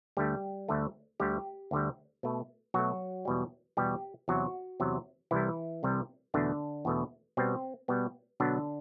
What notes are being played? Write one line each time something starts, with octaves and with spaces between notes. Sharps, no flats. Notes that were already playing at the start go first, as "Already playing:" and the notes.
D2 D3 G3 A3 G4
D2 D3 A3
D2 D3 G3 G4
D2 D3 G3
B2 A3
B2 F#3 A3 F#4
E2 B2 G3
E2 B2 G3 G4
E2 C3 F#3 F#4
E2 C3 F#3
C2 C3 E3 G3 E4
C2 C3 G3
E2 B2 D3 A3 D4
E2 B2 A3
B2 G3 B3 C4
B2 G3 B3
B2 D3 F#3 B3 D4